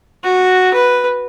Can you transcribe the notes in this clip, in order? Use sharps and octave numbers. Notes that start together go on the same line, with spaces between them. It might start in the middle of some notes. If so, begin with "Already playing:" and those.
F#4
B4